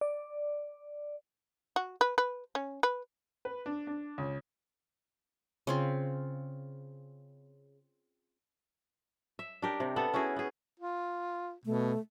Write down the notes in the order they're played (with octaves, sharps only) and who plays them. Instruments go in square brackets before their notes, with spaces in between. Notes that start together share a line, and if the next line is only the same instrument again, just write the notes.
[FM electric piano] D5
[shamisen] F#4
B4
B4
C#4
B4
[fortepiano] B4
D4
D4
C#2
[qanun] C#3 C4 F4
[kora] E5
D4 G4 A#4
C3
B3 A4 F#5
C#4 E4 F#4 G#4
B3 G#4
[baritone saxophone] F4
[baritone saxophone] B2 [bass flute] A3